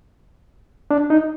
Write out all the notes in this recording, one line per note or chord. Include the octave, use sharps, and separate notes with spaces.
D4
D#4